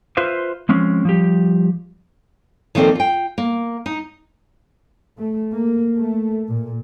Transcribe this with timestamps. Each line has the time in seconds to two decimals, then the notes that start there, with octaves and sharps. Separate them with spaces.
0.17 F4 B4 C5 E5 F5
0.69 F3 G#3 C4 C#4
1.05 F3 G3 G4
2.75 D#3 F3 A#3 C4 A4 D5
2.95 F4 G5
3.38 A#3
3.86 D#4
5.18 A3
5.52 A#3
5.97 A3
6.49 A#2